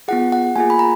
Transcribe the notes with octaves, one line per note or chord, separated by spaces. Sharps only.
B3 F4 G#4 F#5
F#5
A#3 F4 G#4 G#5
B5
A#5